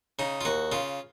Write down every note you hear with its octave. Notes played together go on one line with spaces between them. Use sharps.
C#3 D#4
F4
D#2 F#4
C#3 F4